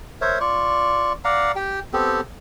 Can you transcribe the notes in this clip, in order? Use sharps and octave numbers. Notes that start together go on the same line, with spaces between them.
A#4 C5 C#5 E5
F4 D5 C#6
D5 F5 F#5 A#5
G4 G5
B3 C4 G4 A4